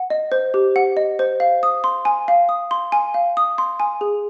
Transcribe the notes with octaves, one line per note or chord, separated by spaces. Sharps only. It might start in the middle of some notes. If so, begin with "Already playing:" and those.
Already playing: F#5
D#5
C5
G4
F#5
D#5
C5
F5
D#6
C6
G#5
F5
D#6
C6
G#5
F5
D#6
C6
G#5
G#4